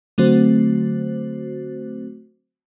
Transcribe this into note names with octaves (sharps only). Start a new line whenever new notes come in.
D3 F#3 A3 C4 F#4 C5